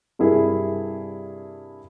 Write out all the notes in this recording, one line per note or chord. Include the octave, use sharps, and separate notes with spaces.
G2 C3 E4 G#4 A#4